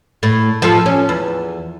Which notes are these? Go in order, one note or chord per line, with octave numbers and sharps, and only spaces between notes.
A2
F3 A4
C#4
E2